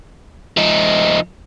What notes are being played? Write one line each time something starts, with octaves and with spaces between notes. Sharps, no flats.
F3 D#4